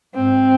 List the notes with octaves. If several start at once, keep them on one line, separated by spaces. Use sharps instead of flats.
G#2 C4